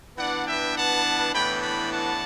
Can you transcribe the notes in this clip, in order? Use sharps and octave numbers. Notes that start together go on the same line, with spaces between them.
E3 B3 D4 D5 F#5
E5 G5
F#5 A5
A2 E3 B3 D4 G5 B5
G5 B5
F#5 A5